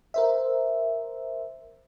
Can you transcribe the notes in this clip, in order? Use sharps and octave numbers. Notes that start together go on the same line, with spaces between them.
A#4 C5 E5